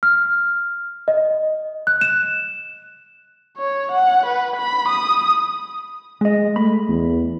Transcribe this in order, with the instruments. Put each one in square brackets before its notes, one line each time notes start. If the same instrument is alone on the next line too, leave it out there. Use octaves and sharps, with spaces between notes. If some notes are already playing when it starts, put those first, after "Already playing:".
[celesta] F6
D#5
F#6
E7
[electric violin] C#5
F#5
B4
B5
D#6
[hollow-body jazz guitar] G#3 D#5
[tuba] A3 [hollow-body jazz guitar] B5
[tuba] E2